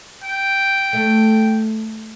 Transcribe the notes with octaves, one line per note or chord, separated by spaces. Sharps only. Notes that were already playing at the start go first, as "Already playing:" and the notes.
G5
A3